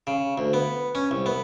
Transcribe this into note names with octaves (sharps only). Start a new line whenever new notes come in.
C#3
D2
B3
C#4
C2
B3